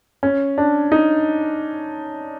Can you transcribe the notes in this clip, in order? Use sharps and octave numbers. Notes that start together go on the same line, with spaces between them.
C#4
D4
D#4